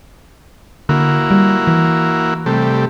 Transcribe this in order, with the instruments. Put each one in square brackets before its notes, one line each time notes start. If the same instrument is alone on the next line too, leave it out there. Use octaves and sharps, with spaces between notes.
[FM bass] D3 [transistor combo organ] A#3 E4 F#4
[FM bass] G3
E3
[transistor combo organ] C3 G3 A3